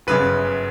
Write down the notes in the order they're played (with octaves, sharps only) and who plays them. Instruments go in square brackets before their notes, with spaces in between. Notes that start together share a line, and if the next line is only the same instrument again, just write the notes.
[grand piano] G1 F#2 C#3 B4